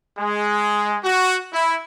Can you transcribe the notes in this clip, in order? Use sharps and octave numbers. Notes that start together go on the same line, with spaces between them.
G#3
F#4
E4